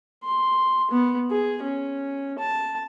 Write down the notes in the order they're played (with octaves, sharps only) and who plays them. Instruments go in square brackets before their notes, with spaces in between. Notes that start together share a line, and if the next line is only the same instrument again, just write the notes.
[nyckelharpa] C6
B3
G#4
C#4
A5